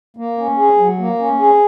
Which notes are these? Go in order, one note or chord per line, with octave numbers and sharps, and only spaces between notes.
A#3
C#4
G#4
F#3
A#3
C#4
G#4